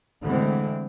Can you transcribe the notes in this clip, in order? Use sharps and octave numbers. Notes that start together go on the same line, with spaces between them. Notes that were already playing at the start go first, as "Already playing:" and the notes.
D3 E3 G#3 A3 C4